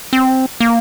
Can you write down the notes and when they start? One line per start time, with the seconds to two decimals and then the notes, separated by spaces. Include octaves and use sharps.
0.13 C4
0.60 A#3